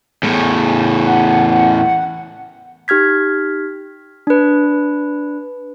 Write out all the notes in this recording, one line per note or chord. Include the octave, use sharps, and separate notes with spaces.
E2 A2
F#5
D#4 G4 F6 G#6 B6
D4 B4